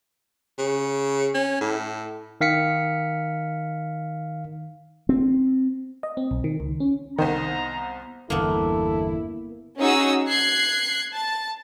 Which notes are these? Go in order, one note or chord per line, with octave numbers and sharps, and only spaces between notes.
C#3
C#4
A2
D#3 F5 B6 C#7
C4
D#5
C4
B1
D#3
C#2
C#4
C2 D#3 B3 C5 D#5 A#5
G1 E2 D3 A#3 B3 E4 A4
C#4 D#4 F#4 G#4 D#6 E6
F#6 G#6 C7
A5